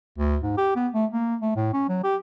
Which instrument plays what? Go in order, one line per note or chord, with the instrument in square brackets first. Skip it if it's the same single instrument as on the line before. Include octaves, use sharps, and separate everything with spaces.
[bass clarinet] D2
G#2
G4
B3
A3
A#3
A3
A2
C#4
F#3
G4